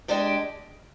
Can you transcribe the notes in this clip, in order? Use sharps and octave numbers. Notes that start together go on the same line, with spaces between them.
G#3 D4 G4 D5